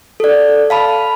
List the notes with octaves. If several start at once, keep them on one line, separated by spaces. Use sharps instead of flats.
A4 D5
F5 A5 B5